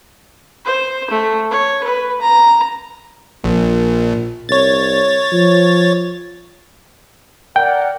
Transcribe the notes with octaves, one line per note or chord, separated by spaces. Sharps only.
C5
A3
C#5
B4
A#5
A#1 A#2
C2 C#5 A6
F3
A#4 D5 F#5 G5